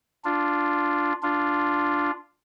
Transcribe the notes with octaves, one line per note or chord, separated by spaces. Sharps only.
D4 F4
D4 F4